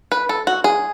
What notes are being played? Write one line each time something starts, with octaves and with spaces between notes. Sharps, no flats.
B4
A4
F#4
G#4